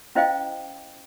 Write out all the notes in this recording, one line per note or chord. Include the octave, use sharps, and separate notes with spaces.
C#4 E4 C5 D#5 F5 G5